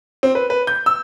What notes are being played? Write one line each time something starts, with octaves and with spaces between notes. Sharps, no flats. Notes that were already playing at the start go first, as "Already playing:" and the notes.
C4
B4
B4
G6
E6